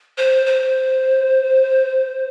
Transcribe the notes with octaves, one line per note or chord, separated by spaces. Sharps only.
C5
C5